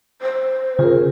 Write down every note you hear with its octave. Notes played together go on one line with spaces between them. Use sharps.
C5
C#3 F4 G#4 A#4